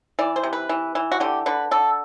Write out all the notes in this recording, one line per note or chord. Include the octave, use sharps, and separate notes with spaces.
E3 D5
C5
C3
B4
E3
E3
F#4
D3 G4
D3 B4
D3 A4